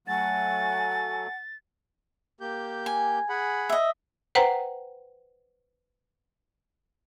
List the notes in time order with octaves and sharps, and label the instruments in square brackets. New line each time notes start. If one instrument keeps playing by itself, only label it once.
[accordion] F#3 A3 [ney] F#5 [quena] G#5 [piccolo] A6
[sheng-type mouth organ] A#3 G4 G6
[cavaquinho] G#5
[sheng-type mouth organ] G#4 F#5 B5
[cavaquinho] D#5 E5
[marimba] B4 C5 F#5 G5 A#5